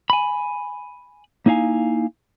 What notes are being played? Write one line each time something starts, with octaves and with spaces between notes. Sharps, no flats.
G#5 B5
A#3 D#4 E4 F5 G#5